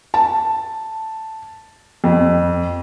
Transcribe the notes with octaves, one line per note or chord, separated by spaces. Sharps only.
A5
F2